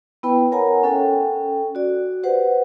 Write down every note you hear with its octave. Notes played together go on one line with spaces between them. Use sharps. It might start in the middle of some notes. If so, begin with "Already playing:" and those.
B3 E4 B4 G5 B5
A#4 C#5 F#5 G#5 A#5
C#4 A4 G5
F#4 D5
G4 B4 C5 F#5